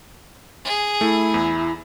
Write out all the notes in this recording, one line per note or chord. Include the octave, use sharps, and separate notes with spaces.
G#4
A3 E4
E2